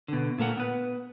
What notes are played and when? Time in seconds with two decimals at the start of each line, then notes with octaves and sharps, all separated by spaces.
0.08 B2 D3
0.38 A#2 A3 A#4 F#5
0.57 B3 B4